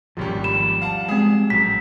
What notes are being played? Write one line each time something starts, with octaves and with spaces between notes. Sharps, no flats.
G#1 D#2 F3 G3 C#4 G4
B5 E7
F5 F#5 A5
G#3 C4 G#4
A1 F#3 B6